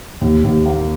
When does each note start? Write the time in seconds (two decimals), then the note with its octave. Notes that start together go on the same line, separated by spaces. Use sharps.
0.21 D#2
0.44 D#2
0.66 A#3